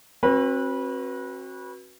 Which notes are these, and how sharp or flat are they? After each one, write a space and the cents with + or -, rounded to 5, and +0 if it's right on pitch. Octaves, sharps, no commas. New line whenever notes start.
C4 +40 F#4 +0 B4 -20